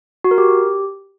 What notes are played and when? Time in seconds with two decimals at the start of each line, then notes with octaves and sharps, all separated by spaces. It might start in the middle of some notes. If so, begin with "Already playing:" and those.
0.24 F#4
0.31 A#4
0.38 G4